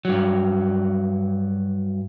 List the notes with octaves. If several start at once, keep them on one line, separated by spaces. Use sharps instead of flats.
G2 F#3